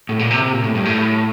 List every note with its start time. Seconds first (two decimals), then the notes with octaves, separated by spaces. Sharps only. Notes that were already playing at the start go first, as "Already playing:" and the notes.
0.09 A2
0.19 A#2
0.30 C3
0.42 C3
0.52 A#2
0.64 A2
0.75 G2
0.85 A2